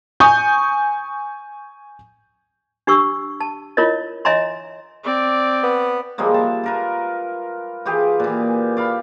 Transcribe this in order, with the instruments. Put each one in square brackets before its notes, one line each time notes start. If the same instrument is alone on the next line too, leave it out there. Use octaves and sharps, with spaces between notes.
[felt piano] G#5 C#6 D#6 G6
[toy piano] D4 G4 C#6 E6
A5
E4 F4 A#4 C#5 D#5
C#5 D#5 E5 G#5 A#5 C6
[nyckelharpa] C4 D5
[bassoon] B3
[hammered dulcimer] F3 G3 G#3 A#3
E5 A5
F4 A#4 B4
E3 F4 G4 G#4
A#2 E3
D5 F5 B5